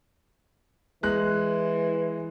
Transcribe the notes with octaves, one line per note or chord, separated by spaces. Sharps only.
E3 G#3 F#6